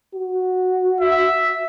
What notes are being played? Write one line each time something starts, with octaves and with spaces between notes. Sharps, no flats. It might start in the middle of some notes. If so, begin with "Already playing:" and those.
F#4
E5